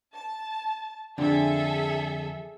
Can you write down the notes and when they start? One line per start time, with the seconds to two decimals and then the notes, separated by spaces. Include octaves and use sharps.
0.14 A5
1.18 F2 D3 D4 G#4 A4 E5